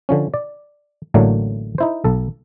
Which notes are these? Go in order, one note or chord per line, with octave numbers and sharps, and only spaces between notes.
D3 F3 C#4
D5
A1 A2 D3 F#3 A3 A#3
D#4 E4 C5
B1 A4